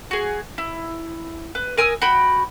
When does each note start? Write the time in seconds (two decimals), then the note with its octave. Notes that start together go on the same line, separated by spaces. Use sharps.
0.11 F#4 G#4
0.58 E4
1.55 B4
1.77 A#4 G#5 D#6 E6
2.02 F#4 G5 B5